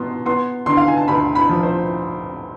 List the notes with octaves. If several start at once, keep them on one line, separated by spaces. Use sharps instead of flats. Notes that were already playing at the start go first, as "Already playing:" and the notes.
Already playing: B2 B3 C6
B3 C6
D3 C6
F5
G#5
A5
D2 B5
B5
F3
C5